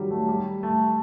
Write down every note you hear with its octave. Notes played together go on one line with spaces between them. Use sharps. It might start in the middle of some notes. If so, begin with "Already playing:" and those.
Already playing: D#3 F#3 G3
A3
G3
A3